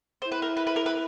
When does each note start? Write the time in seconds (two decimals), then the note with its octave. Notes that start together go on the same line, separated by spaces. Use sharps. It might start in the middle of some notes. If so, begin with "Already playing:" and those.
0.22 C5
0.27 E4 B4
0.42 A#4
0.57 B4
0.67 B4
0.76 A#4
0.86 B4